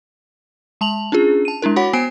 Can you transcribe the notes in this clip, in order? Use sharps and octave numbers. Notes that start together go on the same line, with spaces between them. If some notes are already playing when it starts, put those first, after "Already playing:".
G#3 A5 F7 F#7
C#4 D4 F4 G#4
A5 D#7
G#3 D4 E4 A#4
F#4 C#5 F#5 B5 B6
B3 C5 G5 G#5 C7 D7